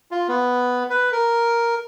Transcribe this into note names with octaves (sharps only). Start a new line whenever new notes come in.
F4
B3
B4
A#4